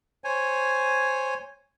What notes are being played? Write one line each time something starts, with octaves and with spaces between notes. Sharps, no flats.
C5 C#5 G#5